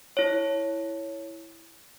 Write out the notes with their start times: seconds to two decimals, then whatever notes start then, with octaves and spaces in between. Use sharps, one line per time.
0.17 E4 C#5